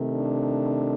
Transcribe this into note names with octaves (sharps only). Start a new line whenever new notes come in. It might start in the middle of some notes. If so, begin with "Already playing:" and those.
Already playing: C3 D#3 A3
D4